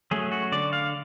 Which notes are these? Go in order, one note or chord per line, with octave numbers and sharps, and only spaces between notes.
F#3 A3 C#4 G#4
F#4
D3 D5
F5